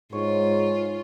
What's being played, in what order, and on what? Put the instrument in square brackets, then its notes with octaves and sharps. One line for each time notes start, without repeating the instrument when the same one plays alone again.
[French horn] G#2 [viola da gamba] F4 [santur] C#5